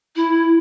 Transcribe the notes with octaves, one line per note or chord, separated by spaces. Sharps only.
E4